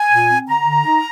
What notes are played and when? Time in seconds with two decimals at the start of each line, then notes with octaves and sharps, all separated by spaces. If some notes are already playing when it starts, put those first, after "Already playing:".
Already playing: G#5
0.10 A#2
0.29 C4
0.47 D3 A#5
0.65 D3
0.85 D#4